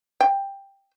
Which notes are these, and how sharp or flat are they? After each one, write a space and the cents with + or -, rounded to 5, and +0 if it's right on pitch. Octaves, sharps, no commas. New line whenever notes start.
G5 +10